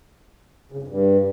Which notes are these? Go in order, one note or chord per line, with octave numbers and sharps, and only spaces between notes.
C#3
F#2
F2
G2